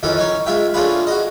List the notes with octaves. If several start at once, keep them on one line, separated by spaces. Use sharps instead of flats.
F2 D#3 E3 C#4 A4
C#4 D#4 C#5
G#3 F4 E5 G5
A3 C#4 D4 F4 G#4 B4
F#4 D#5